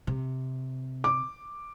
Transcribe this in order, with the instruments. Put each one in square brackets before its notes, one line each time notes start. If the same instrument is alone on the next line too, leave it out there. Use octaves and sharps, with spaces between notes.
[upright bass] C3
[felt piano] D6